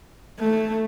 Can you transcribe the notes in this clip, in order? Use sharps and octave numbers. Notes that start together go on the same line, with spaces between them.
A3